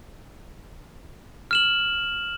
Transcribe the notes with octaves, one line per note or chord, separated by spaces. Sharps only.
F6 E7 F#7